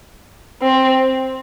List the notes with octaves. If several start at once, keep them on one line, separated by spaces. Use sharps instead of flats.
C4